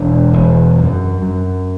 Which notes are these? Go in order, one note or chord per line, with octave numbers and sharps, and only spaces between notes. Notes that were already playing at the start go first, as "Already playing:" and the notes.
Already playing: E1 D4
E1
F#2
F#2